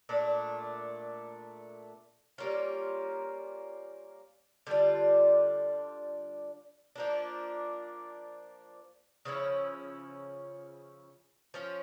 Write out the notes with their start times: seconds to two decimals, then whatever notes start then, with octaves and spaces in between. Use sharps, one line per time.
0.09 A#2 A3 D4
2.38 G3 A#3 C#4 F4
4.67 D3 G3 D4 F4
6.95 F3 A#3 D4
9.25 C#3 F3 C#4 E4
11.54 F3 C#4 F4